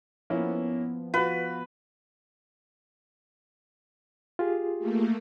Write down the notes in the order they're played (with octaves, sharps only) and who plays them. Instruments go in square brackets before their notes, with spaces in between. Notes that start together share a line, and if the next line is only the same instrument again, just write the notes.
[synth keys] F3 B3 [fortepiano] A#3 C#4 E4
[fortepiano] F4 F#4 [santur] B4
[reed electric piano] F4 G4 G#4
[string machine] A3 A#3